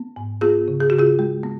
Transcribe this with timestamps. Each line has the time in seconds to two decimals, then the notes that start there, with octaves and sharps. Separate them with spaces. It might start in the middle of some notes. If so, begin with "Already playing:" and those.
Already playing: B3
0.16 G#2
0.41 B3 F4 G#4
0.68 C#3
0.80 G#4
0.90 C#3 F#4
0.99 F4 G#4
1.19 G#3
1.43 B3